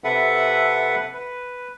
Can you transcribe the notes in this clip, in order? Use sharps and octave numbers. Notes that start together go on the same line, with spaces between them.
C3 A4 B4 E5 F#5
B4